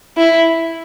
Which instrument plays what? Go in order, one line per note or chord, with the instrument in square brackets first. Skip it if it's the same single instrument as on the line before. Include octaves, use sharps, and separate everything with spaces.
[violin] E4